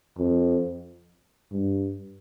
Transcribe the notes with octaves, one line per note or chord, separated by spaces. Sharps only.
F2
G2